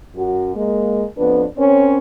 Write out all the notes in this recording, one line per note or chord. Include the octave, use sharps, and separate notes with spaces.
F#2 F#4
G#3 A#3
F2 B3 D4 B4
C4 C#4 A#4 C#5